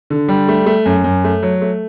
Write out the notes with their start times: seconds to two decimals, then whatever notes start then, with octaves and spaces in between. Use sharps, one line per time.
0.10 D3
0.28 G3
0.48 A3
0.66 A3
0.86 F#2
1.04 F#2
1.24 A3
1.42 F#3
1.62 A3